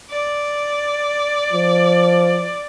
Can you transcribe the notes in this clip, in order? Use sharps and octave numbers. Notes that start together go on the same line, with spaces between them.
D5
F3